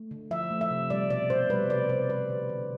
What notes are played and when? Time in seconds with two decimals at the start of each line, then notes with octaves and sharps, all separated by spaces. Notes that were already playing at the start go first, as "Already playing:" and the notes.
Already playing: A3
0.11 D3
0.31 F3 E5
0.51 A3
0.61 E5
0.71 C3
0.90 G3 D5
1.10 B2 D5
1.30 B2 C5
1.50 G3 B4
1.70 C3 D5
1.89 C3 C5
2.09 G3 B4
2.30 D3
2.49 D3